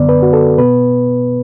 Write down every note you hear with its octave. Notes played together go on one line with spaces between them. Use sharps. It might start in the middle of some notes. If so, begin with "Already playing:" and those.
Already playing: F#2 D3 B3 D5
B4
F#4
A4
B2 B3 B4